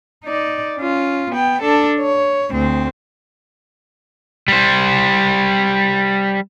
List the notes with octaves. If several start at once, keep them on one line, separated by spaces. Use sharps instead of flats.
D#4 D5
C#4 F4
B3 G5
D4 A4
C#5
D2 C4
G3 C5